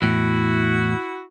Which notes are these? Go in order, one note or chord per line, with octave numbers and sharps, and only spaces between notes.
E2 A2 E4 F#4